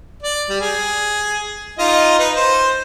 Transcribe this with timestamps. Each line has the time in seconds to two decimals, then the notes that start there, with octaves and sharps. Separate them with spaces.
0.23 D5
0.49 G3
0.61 G#4
1.79 D#4 F4 D#5
2.19 D#4 B4
2.36 C5